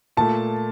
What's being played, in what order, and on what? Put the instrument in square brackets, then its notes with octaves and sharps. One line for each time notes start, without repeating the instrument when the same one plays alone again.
[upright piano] A#2 A3 A5